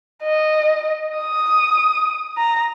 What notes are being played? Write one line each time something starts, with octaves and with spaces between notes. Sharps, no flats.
D#5
D#6
A#5